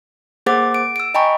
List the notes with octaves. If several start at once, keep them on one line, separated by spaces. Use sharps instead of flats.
A#3 G#4 C5 F#5 D6 A6
D7
E6 D7
D#5 G5 G#5 A#5 B5 C#6